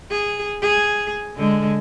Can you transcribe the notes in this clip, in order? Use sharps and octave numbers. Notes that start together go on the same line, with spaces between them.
G#4
G#4
D3 G#3